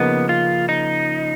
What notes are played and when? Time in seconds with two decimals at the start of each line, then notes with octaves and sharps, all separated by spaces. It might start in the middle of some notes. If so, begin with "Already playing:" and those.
Already playing: C#3 F3 A#3 B3 D#4
0.29 F4
0.69 D#4